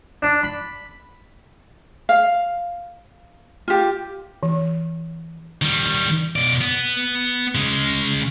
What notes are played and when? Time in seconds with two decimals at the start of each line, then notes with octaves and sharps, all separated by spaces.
0.23 D4
0.43 B5
2.09 F5
3.68 F4 G4
4.43 E3
5.62 D#3 G3
6.36 B2 D5
6.61 B3
7.55 C#3 G#3